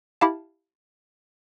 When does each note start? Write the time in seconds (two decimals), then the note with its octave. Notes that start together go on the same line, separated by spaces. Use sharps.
0.21 E4 G4 F5 A5